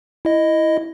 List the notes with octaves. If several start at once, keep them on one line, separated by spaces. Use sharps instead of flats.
E4 D#5